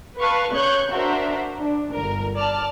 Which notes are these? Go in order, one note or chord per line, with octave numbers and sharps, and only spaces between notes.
B4 F5 A5 B5 C#6
C#3 C#5 C#6 F#6 G6
D4 F#4 A#4 C5 E5
D4
G1 A#4
D5 A5 F6